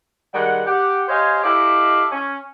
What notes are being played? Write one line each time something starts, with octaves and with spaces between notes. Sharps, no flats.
D#3 G3 G#3 F#5
G4 F#5
G4 C5 C#5 D#5 F5 G#5
E4 G4 A4 D#5 F5
C#4